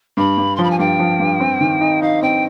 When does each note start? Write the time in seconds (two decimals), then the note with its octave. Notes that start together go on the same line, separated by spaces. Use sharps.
0.17 G2 B5
0.38 G2
0.56 C6
0.59 F3 B5
0.70 G#5
0.79 G2 G5
0.99 F3
1.20 G2
1.40 C4
1.61 D#3
1.81 D#4
2.02 D#4 F5
2.22 C4 G5